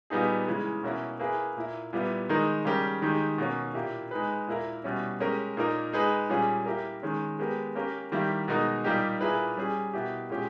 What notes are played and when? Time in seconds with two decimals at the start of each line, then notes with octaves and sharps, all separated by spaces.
0.10 A#2 G3 B3 D#4 G#4
0.47 C#3 E3 G#3
0.83 B2 A#3 C#4 E4
1.19 A#3 E4 G#4 B4
1.56 A#2 A#3 E4
1.93 A#2 G3 B3 E4
2.29 D#3 G#3 D#4 A#4
2.65 C#3 G3 C#4 G4 A#4
3.02 D#3 G#3 D#4 G4
3.38 B2 A#3 C#4
3.74 A#2 A#3 E4 G4
4.11 G#3 D#4 G#4 B4
4.47 A#2 A#3 E4 A#4
4.84 B2 G3 C#4 E4
5.20 G#3 C#4 G4 A#4
5.57 A#2 A#3 D#4 A#4
5.93 G#3 D#4 G#4 B4
6.30 A#2 G3 C#4 G#4
6.66 A#3 E4 G4 A#4
7.03 D#3 G#3 C#4
7.39 G#3 B3 G4 A#4
7.75 A#3 C#4 G4 A#4
8.12 D#3 G3 A#3 E4 G4
8.48 B2 G#3 D#4 A#4
8.84 A#2 G3 A#3 D#4 G4
9.21 A#2 A#3 E4 G#4 B4
9.57 G3 C#4 G#4
9.93 B2 A#3 E4 G4
10.30 A#2 G#3 C#4 G4